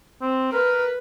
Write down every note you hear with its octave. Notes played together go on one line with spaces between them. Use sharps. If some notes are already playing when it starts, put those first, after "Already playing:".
C4
A#4 B4